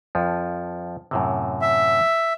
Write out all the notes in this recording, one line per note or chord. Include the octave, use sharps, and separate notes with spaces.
F2 F3
F#2 A2 C3
E5